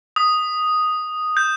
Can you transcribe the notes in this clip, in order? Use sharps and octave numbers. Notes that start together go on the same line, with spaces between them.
D#6
G6